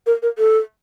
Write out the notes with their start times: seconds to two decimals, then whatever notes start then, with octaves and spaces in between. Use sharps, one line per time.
0.07 A#4
0.23 A#4
0.38 A4